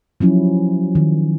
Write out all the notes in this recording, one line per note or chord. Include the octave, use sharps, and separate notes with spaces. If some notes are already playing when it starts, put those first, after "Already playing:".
F3 F#3 C#4 E4
D#3